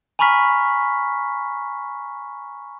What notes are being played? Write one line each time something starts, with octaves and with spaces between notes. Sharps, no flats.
G#5 A#5 B5 C#6 F6 B6